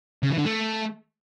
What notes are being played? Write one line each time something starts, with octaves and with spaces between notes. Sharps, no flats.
C#3
E3
D3
A3